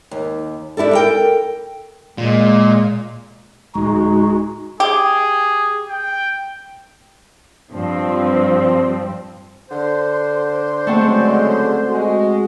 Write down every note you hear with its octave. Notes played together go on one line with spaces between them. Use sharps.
D#2
D4 E4 G4 A4
A4 A#4 G5
A#2 G#3
D1 G#3 D#4 F#4
G4 G#4
G5
G2 F3 C4
D3 C5
C#3 F#3 G#3 A3 C4 F#5
G#3 F#4